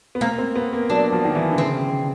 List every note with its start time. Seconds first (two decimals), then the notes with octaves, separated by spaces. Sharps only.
0.15 B3
0.21 A#3 C4
0.38 C4
0.56 B3
0.73 A#3
0.90 F#3 D4
1.12 F3
1.25 D#3
1.35 E3
1.52 D3
1.58 C#3 C4